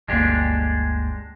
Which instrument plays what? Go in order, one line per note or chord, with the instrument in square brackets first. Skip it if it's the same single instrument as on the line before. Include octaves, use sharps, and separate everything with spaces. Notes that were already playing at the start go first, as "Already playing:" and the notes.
[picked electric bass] G1 D2 A#3 [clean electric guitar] G#3 D4 G4